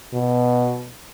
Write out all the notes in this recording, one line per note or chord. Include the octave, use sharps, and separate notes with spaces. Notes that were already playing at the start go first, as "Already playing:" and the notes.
B2